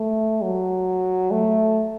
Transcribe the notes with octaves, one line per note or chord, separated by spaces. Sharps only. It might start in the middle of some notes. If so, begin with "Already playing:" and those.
Already playing: A3
F#3
A3